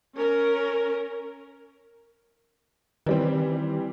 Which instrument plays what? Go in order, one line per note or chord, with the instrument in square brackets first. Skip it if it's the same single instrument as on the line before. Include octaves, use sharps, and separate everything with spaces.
[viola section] C#4 A#4
[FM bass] D#3 [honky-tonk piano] E3 G3 C4